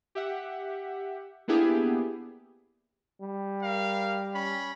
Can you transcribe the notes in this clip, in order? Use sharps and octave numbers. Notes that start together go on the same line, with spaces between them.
G4 E5 F#5
A#3 B3 D4 E4 G4 G#4
G3
A#4 F5
C#4 B5